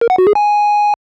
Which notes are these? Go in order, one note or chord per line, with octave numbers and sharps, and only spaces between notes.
A#4
F#5
F#4
G#4
G#5